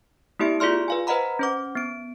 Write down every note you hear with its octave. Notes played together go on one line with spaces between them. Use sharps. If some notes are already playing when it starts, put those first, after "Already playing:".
A3 B3 E4 G4 E5 D7
F4 G#4 D5 C6 F6
B4 F5 G#5
B4 C5 D#5 F#5 A#5 B5
C#4 C5 D6
B3 D7